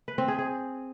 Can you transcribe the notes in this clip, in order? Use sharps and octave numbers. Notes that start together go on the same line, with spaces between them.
B4
C4
G#4
G#4